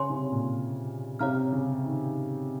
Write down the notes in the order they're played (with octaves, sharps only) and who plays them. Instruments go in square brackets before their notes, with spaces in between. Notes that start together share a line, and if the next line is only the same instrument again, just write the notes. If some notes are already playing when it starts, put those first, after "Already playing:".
Already playing: [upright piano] C#3 [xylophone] C#5 G#5 C6
[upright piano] C3
A#2
[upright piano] C3 [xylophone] C#5 F5 A#5 F6
[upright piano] C#3
D#3